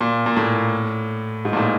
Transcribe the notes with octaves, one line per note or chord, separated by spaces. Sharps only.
A#2
A#2
A2
G#2
A#2
A2